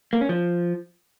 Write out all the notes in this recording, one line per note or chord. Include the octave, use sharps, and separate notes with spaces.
A#3
C#4
F3